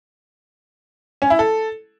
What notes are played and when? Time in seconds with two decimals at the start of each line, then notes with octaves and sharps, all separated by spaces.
1.22 C#4
1.30 E4
1.39 A4